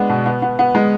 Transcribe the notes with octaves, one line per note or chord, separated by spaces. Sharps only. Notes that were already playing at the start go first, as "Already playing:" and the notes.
Already playing: G#3 B3 D4
B2
B3
B3
B3
G#3